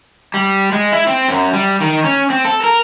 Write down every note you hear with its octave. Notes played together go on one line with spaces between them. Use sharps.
G3
G#3
E4
C4
F#2
G3
D#3
C#4
C4
A4
A#4